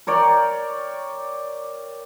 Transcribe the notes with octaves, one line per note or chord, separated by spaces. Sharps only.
A#4 C#5 D5 G5